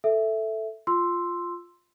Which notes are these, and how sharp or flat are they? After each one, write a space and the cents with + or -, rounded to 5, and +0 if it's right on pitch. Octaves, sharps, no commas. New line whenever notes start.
A4 +0 E5 +0
F4 +0 C6 +0 E6 +5